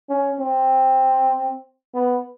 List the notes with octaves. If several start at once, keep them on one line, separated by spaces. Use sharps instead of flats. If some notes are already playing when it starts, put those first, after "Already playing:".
C#4
C4
B3